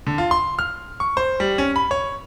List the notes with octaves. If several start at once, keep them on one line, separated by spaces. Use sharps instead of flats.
D3
F4
C6
F6
C#6
C5
G3
C#4
B5
C#5